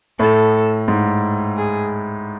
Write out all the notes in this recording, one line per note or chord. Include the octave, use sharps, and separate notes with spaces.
A2 A4
G#2
G#4